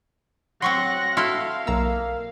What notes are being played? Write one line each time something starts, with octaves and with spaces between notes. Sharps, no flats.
F#3 C4 F#5 C6 C#6 A#6
E4 F#4 A4 F5 C6 F6
B1 A#3 A#5 E6